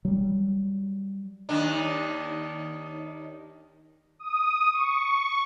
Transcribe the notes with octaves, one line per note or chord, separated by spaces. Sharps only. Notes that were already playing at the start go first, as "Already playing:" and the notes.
F#3 G3
D#2 D#3 D4
D#6
C#6